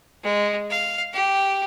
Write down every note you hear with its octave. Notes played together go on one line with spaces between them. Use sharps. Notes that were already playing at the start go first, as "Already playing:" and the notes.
G#3
F5
G4